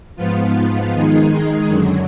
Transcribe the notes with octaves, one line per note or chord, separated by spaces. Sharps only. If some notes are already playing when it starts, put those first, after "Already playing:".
G#2 F3 B3 F4
D#3 G#3 D#4 G#4
F#2 D3 F#3